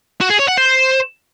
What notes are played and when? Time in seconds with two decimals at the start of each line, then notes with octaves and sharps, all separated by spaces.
0.21 F#4
0.30 G#4
0.39 C#5
0.48 F#5
0.58 C5